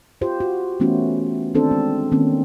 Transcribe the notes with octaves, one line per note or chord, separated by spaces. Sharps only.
F4 G4 C5
F#4
E3 A3 B3 C#4 E4 F#4
D#3 C4 D4 A4 C5
G#3
D#3 A#3 C4 C#4